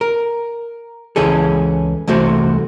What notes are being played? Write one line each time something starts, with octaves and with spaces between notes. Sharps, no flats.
A#4
C#2 E3 C#4 G#4 A4
C2 E3 A3 F#4 C5